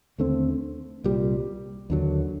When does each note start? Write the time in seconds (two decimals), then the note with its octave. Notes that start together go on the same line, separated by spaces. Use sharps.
0.18 D#2 D3 A3 C4
1.04 C2 A#2 G3
1.90 D#2 D3 F#3